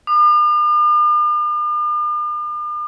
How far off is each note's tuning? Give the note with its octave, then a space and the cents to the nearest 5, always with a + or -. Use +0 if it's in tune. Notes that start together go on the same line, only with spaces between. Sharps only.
D6 +45